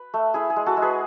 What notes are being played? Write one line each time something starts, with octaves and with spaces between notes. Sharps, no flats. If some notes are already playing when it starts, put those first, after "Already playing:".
Already playing: B4
A3
E4 G#4
G#4
G#3
F#4 A4
G#3
G#4 B4